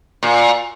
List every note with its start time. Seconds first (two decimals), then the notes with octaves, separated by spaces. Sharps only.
0.23 A#2